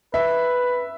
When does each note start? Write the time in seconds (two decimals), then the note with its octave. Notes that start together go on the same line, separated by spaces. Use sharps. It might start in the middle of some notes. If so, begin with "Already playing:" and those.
0.13 B4 E5